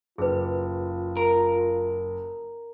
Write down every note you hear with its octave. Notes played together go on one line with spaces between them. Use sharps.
F#1 F4 G#4 B4
A#4